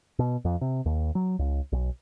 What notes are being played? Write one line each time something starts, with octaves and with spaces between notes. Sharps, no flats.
B2
F2
C3
D#2
F#3
C#2
B1